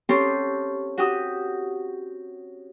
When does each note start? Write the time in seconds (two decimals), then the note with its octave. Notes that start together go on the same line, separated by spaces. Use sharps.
0.09 C4 C#4 G4 A4 C6
0.98 F#4 G4 D#6